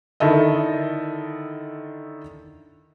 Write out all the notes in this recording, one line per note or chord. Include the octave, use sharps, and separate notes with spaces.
D3 D#3 E4 A4 D#5